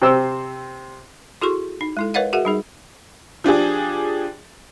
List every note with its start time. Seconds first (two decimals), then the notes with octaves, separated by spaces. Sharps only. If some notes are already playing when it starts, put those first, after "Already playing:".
0.02 C3 C4 C5 E6
1.41 E4 F#4 G#4 A4 C6 C#6
1.81 D#4
1.97 G#3 E4 A4
2.14 A#4 B4 C#5 D#5 F5 F#5
2.33 F#4 G#4 A#4 E5 F#5
2.45 G3 D#4 G#4
3.44 F3 D4 G4 G#4